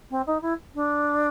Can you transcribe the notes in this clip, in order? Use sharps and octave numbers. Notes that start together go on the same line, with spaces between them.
C4
D#4
E4
D4